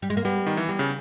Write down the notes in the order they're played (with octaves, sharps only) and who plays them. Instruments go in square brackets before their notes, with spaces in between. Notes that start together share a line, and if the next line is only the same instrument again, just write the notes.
[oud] G3
G#3
A#3
[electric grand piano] G3 [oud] B3
[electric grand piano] D#3
E3
G3
C#3